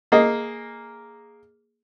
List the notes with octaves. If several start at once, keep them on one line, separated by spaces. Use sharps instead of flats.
A#3 G#4 D#5